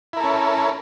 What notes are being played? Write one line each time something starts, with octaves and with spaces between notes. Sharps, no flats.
C#4 E4 A4 A#4